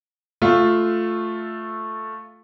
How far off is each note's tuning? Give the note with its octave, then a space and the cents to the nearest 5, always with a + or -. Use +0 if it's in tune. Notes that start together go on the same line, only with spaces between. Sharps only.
A3 +0 F4 +5